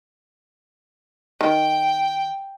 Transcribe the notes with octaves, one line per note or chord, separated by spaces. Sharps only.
D#3 G5